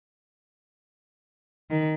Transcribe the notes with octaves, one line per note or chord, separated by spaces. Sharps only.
D#3